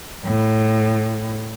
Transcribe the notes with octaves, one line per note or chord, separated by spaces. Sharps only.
A2